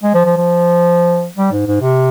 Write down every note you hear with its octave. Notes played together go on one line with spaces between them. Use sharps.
G#3
F3
F3
F3
G3
G#2
G#2
C3